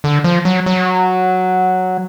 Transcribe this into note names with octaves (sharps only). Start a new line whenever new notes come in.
D3
F3
F#3
F#3